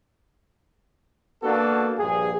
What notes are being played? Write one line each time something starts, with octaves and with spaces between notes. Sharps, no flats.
A#3 B3 D4 F#4 A4
A#1 G2 G#4